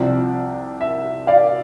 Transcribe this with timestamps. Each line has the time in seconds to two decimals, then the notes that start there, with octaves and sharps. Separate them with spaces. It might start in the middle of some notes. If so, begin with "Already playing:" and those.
Already playing: C2 C3 F3 D5
0.81 E5
1.27 D5 F5